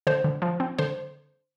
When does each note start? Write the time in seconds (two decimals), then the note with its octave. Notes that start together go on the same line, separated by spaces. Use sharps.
0.07 D3 C5
0.24 D3
0.42 F3
0.60 C4
0.78 D3 C5